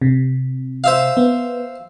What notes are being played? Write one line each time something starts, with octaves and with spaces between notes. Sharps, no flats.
C3
C5 E5 F5
B3